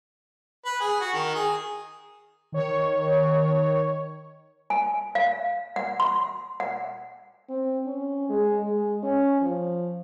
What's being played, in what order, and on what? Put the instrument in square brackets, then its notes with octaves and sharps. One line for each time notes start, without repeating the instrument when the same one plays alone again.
[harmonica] B4
G#4
F#4
D#3
G#4
[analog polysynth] D#3 C#5
[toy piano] G#5
F5
F#5
C6
F#5
[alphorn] C4
C#4
G#3
G#3
C#4
F3